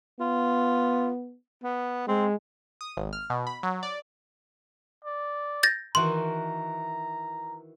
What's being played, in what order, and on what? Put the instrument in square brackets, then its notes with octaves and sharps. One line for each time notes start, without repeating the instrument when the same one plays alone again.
[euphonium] B3 [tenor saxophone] F4
[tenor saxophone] B3
[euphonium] G#3 [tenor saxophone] C4
[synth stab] D#6
G#1
F6
B2
B5
F#3
D5
[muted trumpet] D5
[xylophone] G6 A6 A#6
[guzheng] D#3 E3 F#4 [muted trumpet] A#5 [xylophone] C6